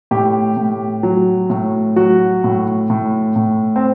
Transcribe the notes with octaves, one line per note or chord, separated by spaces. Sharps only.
A2 G4
A2
F#3
A2
F#3 F#4
A2
A2
A2
C4